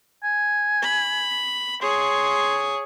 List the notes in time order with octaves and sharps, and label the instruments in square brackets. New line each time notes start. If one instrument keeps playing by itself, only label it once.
[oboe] G#5
[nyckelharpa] B5
[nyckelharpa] G#4 C#5 [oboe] C6